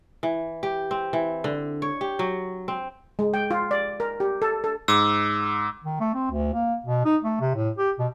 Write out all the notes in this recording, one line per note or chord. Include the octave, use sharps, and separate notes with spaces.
E3
G4
C4
E3
D3
C#5
G4
F#3
C4
G#3
G5
F4
D5
A#4
G4
A4
A4
G#2 D6 E6
D#3
A3
C4
D2
A#3
B2
D#4
A3
C3
A2
G4
B2